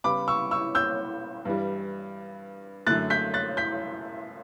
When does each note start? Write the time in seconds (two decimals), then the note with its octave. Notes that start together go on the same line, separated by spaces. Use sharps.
0.04 C#3 G3 B3 B5 D6
0.28 C#6 E6
0.51 C#6 E6
0.75 E6 G6
1.45 G2 E3 G3
2.87 F#2 D3 A3 F#6 A6
3.10 G6 B6
3.34 F#6 A6
3.57 G6 B6